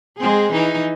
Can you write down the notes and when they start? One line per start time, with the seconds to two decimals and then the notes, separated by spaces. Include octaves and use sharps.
0.17 G#3 C4 G#4
0.52 E3 D#4